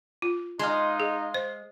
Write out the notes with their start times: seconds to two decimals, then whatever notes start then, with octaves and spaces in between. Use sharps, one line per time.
0.22 F4
0.59 G#3 D#4 F5 C6
1.00 G#4
1.34 C5